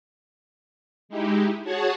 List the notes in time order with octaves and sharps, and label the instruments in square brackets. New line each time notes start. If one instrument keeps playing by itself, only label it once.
[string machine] G#3 D#4 E4 G4
F#4 G#4 C#5 F#5 G#5 A5